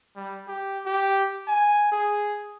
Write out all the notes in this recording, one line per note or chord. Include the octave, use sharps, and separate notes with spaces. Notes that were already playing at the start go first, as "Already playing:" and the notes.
G3
G4
G4
G#5
G#4